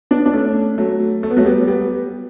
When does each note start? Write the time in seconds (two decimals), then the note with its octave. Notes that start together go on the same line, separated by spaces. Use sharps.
0.11 B3 D4
0.26 D4
0.33 A3 C#4
0.78 F#3 A3
1.23 A3
1.31 B3
1.37 F#3 A3
1.45 G3 B3
1.67 G3 B3